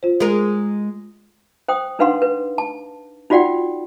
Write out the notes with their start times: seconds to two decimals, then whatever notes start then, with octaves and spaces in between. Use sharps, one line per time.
0.03 F4 C5
0.20 G#3 A#4
1.68 C5 G5 D#6
1.99 D4 D#4 B4 F5 F#5 C6
2.22 B4
2.58 A5
3.30 D#4 F4 F#4 D5 F#5 G5